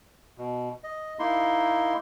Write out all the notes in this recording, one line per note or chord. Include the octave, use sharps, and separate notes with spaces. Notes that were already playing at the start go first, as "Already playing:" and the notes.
B2
D#5
A#3 D#4 E4 C6